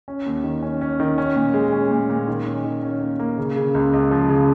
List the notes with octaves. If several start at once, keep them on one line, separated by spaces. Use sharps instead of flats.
C#4
D#2
D#3
C#4
C#4
D#3
C#4
A#2
G#3
C#4
A#2
A#2
D#3
C#4
D#3
C#4
A#3
A#3
C#3
C#3
C#2
C#2
F3
C#3